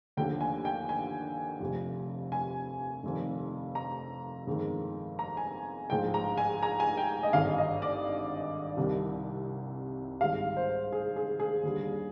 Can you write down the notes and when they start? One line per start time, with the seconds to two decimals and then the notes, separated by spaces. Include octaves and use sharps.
0.17 D#2 D3 F3 G5
0.41 G#5
0.65 G5
0.89 G#5
1.60 F1 F2 C3 F3
2.32 G#5
3.03 F1 F2 D#3
3.75 A#5
4.47 G1 F2 D#3 G#3
5.19 A#5
5.37 G#5
5.90 A#1 G#2 F3 G5
6.14 A#5
6.37 G#5
6.63 A#5
6.80 G#5
6.97 G5
7.23 D#5
7.33 G#1 G2 D3 F5
7.58 D#5
7.82 D5
8.77 C2 C3 D#3 G3
10.21 G#1 G#2 G3 F5
10.57 C5
10.92 G#4
11.16 G#4
11.40 G#4
11.63 D#2 D3 G3